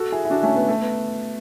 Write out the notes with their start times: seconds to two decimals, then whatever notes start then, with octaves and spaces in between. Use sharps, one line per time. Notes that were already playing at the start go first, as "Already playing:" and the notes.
Already playing: F#4 A4
0.12 E4 G#4
0.25 E4
0.30 D4 F#4
0.43 A3 C#4
0.56 B3
0.68 A3
0.82 B3